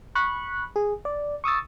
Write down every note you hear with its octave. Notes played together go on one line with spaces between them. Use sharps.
B5 C#6 F#6
G#4
D5
C#6 D#6 E6 A6